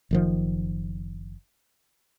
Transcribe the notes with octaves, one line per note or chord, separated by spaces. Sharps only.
F#1 D#3 F3